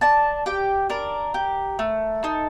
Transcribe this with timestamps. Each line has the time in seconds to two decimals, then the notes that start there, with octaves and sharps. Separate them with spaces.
0.01 D4 A5
0.46 G4 G5
0.90 D4 A#4
1.34 G4
1.79 A3
2.24 D#4 A4